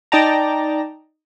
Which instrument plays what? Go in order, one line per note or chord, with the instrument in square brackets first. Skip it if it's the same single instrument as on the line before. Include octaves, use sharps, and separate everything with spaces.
[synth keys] D#4 D5 G5 A5 A#5